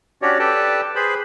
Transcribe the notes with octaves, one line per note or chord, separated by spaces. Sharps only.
C#4 D4 F#4 G4 C#5 D5
G4 A4 B4 D5 G5 A5
G#4 B4 C5 B5